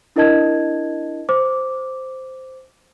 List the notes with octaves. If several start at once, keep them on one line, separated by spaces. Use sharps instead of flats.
D4 E4 A#4 D#5 A5 G#6
C5 D6